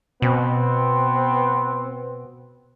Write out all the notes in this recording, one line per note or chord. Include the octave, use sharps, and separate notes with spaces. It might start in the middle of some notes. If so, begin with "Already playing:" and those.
B2 B3 C4